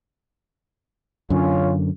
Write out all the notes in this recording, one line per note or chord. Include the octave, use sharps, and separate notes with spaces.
F#2 D3 C#4 F4